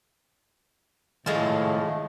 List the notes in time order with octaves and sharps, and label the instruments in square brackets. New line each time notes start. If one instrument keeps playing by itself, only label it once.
[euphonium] A2 [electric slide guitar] D#3 A4 F5 [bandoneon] F3 A3 [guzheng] G#3 F4